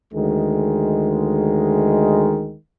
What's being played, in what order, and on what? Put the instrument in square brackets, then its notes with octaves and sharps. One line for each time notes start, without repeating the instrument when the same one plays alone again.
[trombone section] D2 D#3 G#3